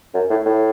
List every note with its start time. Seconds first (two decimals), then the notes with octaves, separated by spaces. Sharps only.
0.14 F#2
0.30 A2
0.45 A2